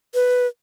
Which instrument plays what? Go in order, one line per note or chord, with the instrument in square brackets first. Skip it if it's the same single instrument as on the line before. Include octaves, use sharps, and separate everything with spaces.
[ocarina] B4